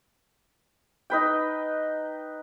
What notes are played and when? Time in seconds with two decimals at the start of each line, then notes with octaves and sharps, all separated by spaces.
1.10 D#4 B4 G5